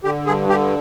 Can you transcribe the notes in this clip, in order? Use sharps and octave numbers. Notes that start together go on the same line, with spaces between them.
D3 G4
G2 G#4
D3 G4